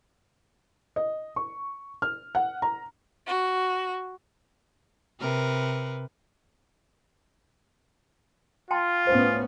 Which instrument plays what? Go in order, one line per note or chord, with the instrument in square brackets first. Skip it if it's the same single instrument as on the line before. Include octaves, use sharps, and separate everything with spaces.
[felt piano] D#5
C#6
F6
F#5
A#5
[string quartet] F#4
[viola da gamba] C3 A#4 B4
[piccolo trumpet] F4 [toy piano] G5 A5 C6
[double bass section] A2 B3 C#4 [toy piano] C5